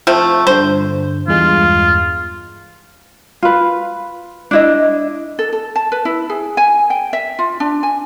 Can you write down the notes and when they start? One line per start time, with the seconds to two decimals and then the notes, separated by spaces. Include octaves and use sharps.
0.07 F3 A3 C4
0.47 G2 D3 C5
1.28 E2 G2 G#3 F4
3.43 F4 B4
4.51 D4 E4 D#5
5.39 A4
5.53 A4
5.76 A5
5.92 B4
6.05 E4
6.30 G#4
6.57 G#5
6.90 G5
7.13 E5
7.39 F4
7.60 D4
7.83 G#5